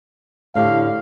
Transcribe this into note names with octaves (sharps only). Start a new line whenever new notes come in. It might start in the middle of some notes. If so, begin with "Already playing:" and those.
A2 D3 G4 F5